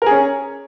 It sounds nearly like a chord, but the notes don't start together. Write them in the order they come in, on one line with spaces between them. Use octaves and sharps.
A#4 G#4 C#4